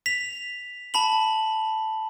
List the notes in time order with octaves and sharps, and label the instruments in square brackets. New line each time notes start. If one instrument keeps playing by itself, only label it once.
[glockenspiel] B6 F7
A5 B5 F#7